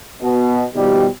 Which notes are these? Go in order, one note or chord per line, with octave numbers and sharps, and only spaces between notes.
B2
B2 D#3 F3 G3